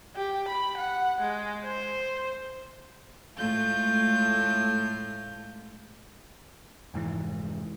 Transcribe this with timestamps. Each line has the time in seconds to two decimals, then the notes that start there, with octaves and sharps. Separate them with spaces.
0.16 G4
0.49 B5
0.77 F#5
1.21 G#3
1.64 C5
3.36 A2 G#3 A3 F4 G6
6.94 F1 G#2 E3